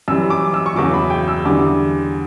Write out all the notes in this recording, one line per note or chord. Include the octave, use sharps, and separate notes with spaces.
F#2 E3 G3 E6
D6
E6
C#6
E2 C#3 F#3 D6
B5
G5
E6
E2 D3 G3 D6